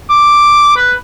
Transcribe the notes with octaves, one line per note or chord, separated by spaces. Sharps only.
D6
B4